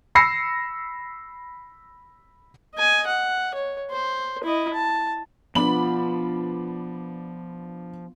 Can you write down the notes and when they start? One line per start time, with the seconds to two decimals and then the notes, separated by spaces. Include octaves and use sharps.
0.15 B5 E6 A#6 C7 C#7
2.74 D#5 G#5
3.07 F#5
3.54 C#5
3.91 C5
4.43 E4 D#5
4.74 A5
5.55 F3 B3 D4 F4 B5 F#7